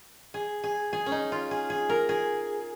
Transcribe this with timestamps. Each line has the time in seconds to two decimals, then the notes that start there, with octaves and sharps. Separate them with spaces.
0.34 G#4
0.64 G#4
0.93 G#4
1.06 C#4
1.12 D#4
1.32 F4
1.51 G#4
1.70 G#4
1.89 A#4
2.09 G#4